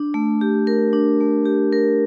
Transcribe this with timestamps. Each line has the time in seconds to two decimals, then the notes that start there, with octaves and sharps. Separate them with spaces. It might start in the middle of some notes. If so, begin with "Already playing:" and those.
Already playing: D4
0.14 A3
0.41 G4
0.67 A#4
0.93 D4
1.20 A3
1.46 G4
1.72 A#4